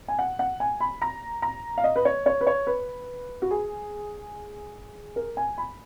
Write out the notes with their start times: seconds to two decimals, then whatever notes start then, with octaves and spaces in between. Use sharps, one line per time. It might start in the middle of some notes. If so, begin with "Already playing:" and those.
0.08 G#5
0.19 F#5
0.39 F#5
0.60 G#5
0.81 B5
1.02 A#5
1.42 A#5
1.78 F5
1.84 D#5
1.96 B4
2.05 C#5
2.26 C#5
2.41 B4
2.47 C#5
2.67 B4
3.42 F#4
3.51 G#4
5.16 A#4
5.37 G#5
5.58 B5